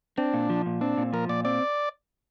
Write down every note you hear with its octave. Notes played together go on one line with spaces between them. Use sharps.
C4 D4
A#2
F3
A#2
C4 D4
A#2
F3 A#4
A#2 D5
C4 D5